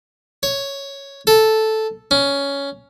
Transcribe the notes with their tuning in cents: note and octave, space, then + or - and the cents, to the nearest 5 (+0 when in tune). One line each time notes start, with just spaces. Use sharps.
C#5 +0
A4 -5
C#4 +10